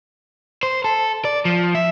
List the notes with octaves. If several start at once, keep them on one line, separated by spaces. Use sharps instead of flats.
C5
A4
D5
F3
E5